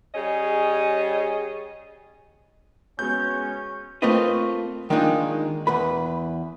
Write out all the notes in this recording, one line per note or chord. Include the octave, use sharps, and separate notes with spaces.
G3 C#4 G#4 D#5
G#3 B3 C#4 F#4 G6
A3 A#3 C4 F4 B4 D#5
D#3 G#3 A#3 D4 D#4 F4
E2 B4 B5